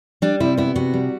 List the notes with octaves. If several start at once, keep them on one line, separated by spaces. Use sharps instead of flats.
G3 D4
C3 E4
B3 E4
C3 F#4
G3